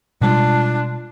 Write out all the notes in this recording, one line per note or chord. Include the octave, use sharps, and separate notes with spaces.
B2 G3 G#3 D4 F4